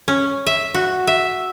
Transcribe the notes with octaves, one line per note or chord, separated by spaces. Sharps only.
C#4
E5
F#4
E5